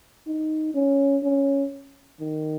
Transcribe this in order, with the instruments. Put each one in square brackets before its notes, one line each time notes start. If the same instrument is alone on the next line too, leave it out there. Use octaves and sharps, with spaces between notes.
[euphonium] D#4
C#4
C#4
D#3